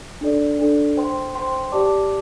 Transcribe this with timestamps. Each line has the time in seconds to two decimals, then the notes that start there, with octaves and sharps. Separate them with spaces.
0.21 D4 A4 D5
0.59 D4 A4 D5
0.96 C5 G5 C6
1.35 C5 G5 C6
1.72 G4 D5 A5 D6